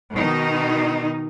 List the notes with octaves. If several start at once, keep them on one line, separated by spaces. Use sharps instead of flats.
B2 D#3 D#4